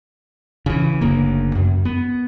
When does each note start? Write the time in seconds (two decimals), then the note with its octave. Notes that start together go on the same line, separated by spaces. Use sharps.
0.66 C#3 E3
1.01 F#1 D2 C#3 A#3
1.55 F#2
1.85 B3